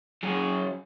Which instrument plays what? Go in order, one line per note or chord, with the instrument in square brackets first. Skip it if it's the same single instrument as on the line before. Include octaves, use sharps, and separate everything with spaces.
[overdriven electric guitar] F#2 G#4